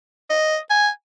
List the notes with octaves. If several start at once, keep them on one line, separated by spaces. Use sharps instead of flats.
D#5
G#5